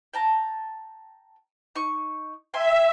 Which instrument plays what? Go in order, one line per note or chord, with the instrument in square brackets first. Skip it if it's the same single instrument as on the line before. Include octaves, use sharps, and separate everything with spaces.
[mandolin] G5 A5 A#5
D#4 C#6
[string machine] E5 [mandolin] G5 G#5 C6